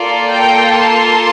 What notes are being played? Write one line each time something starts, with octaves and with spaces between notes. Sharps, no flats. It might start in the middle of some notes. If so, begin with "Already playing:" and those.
Already playing: A#3 F4 A4 D5
G5 A#5
A5 C6